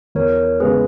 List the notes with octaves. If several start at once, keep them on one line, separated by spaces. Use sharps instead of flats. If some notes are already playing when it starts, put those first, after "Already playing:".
E2 A#4 C#5
C#3 G#3 B3 G#4 B4